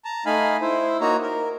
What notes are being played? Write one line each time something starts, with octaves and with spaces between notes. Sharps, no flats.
A5 A#5
A3 D#4 F5 G#5 B5
E4 C5
A#3 D#4 F#4 C#5 A#5
A#4